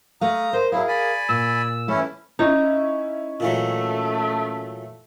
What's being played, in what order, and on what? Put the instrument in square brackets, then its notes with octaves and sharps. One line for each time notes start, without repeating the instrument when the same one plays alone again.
[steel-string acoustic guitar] A3 F5 [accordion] A#5 D#6
[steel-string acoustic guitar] A#4 [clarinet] C5
[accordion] F#3 E4 [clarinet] G#4 [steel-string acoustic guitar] A#4 F5
[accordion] D5 G#5 B5
[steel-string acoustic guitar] A#2 [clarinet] E6
[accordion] E3 C#4 E4 [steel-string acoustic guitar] A3
[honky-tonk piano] C#4 E4 [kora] D#4
[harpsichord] A#2 E3 F#3 [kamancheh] A3